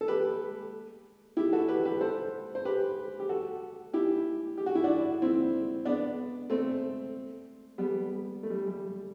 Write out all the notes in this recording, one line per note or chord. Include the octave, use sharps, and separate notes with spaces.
A4
G4 B4
E4 G4
F#4 A4
G4 B4
G4 B4
A4 C5
C5
G4 B4
G4
F#4 A4
E4 G4
G4
F#4
E4
D4 F#4
C4 E4
B3 D4
A3 C4
G3 B3
A3
G3
G3